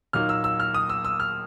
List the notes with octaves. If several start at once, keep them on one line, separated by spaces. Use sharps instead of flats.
A#2 F#3 A#3 D#4 F6
E6
E6
F6
D#6
E6
E6
F6